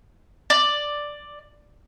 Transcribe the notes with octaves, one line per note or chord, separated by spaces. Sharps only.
D5